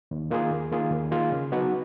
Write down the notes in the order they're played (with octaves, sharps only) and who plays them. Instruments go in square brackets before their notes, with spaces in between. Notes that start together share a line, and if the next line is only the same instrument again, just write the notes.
[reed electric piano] D#2
D#3 A#3 F4 G#4
D#2
D#3 A#3 F4 G#4
D#2
D#3 A#3 F4 G#4
C#3
F#3 B3 D#4 F#4